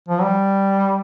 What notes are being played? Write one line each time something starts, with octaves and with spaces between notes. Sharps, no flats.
F3
G3